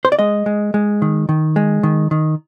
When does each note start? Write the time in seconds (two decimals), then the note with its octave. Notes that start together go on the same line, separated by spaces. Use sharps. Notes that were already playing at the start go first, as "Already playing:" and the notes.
0.05 C5
0.12 D5
0.19 G#3 D#5
0.46 G#3
0.74 G#3
1.02 D#3
1.29 D#3
1.56 G#3
1.83 D#3
2.11 D#3